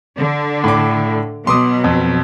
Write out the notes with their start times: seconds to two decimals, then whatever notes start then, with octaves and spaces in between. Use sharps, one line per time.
0.18 D3
0.64 A2 D6
1.47 B2 F#3 C6 D6 D#6
1.84 F2